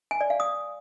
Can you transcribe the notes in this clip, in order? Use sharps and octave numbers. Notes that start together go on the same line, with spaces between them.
G#5
D5
F5
D#6